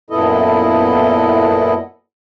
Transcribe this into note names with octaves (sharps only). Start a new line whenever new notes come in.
F#2 A#2 B3 E4 A4 D#5